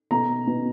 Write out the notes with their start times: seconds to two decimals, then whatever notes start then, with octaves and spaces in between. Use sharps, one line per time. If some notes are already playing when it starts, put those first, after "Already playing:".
0.11 B2 A#5
0.47 B2